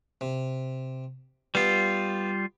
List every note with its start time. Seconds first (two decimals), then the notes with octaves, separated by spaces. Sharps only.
0.21 C3
1.55 G3 B3 F4 G4